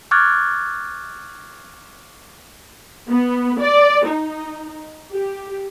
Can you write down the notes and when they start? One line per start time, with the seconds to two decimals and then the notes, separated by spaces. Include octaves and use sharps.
0.11 C#6 D6 F6 F#6 G#6 A6
3.08 B3
3.60 D5
4.06 D#4
5.11 G4